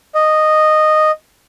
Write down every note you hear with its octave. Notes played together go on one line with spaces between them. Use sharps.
D#5